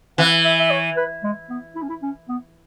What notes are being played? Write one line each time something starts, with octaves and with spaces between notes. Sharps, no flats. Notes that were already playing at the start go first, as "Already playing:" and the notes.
E3 F#5
E5
E5
C#5
B4
G#3
B3
E4
C#4
E4
C#4
B3